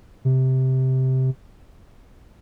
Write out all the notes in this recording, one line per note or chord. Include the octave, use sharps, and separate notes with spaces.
C3